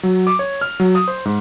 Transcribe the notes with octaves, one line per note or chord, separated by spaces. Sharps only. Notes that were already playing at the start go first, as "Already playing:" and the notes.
F#3
D6
C#5
F6
F#3
D#6
C5
G#2